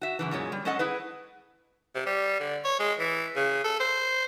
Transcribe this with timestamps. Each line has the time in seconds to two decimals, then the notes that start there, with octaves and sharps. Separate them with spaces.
0.01 F#4 E5
0.19 F#2 C#3 E3
0.31 F#2 A#2 G#3 C#5
0.52 G3
0.65 G#3 C#4 A4 D#5 F#5
0.79 E4 G#4 B4
1.95 C3
2.06 G3
2.40 D3
2.65 C#5
2.79 G#3
2.98 E3
3.36 C#3
3.64 A4
3.80 C5